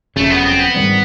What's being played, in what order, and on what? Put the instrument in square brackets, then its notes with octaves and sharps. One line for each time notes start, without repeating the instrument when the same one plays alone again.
[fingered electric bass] F#1 F2 C#3 [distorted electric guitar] A3
[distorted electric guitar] B3
C4
B3
[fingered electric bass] G#2 D#3 G3 C4